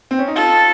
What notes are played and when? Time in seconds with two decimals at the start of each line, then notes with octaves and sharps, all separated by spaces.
0.11 C4
0.19 C#4
0.27 D#4
0.35 F4 A4